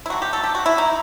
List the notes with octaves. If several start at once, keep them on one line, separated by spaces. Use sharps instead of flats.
E4
D#3 A3 F#4
G4
A4
G4
F#4
E4
D#4